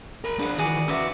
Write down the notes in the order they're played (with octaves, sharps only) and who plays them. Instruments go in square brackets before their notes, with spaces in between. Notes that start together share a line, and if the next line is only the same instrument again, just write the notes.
[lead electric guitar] A#4 B5
[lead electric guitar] D4 G#4 [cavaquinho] B4 F#5
[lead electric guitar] D#3 E3 [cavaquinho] F#4 G#4 D5
[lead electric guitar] C#4 B4 [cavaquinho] F#4 D5 E5